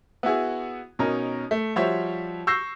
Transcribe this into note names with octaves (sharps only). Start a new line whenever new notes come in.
B3 E4 F#4 G#4
B2 C#4 D#4 A#4
A3
F3 G3 F#4 C5 C#5 E5
C#6 E6 G6 A#6 C7